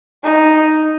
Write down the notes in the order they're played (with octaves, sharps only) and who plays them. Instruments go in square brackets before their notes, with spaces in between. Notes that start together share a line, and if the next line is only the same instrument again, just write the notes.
[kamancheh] D#4